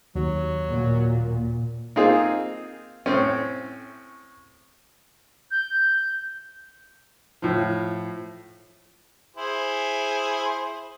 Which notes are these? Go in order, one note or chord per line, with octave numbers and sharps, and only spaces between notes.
D#2 F#3
A#2
A#3 C4 D#4 F4 G#4
A2 C4 C#4
G6
A2 F3
E4 G#4 C5